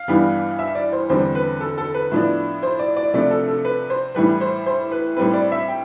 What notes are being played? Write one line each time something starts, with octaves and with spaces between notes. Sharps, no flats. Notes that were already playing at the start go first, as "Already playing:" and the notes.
Already playing: F5
G2 E3 G3 B3 D4
E5
D5
C5
E2 D3 G3 C4 C5
B4
A4
A4
B4
A2 F3 B3 D4
C5
D5
D5
C3 F3 A3 D4 D5
A4
A4
B4
C5
A2 E3 G3 B4
C5
C5
B4
A2 G3 C4 B4
D5
E5
G5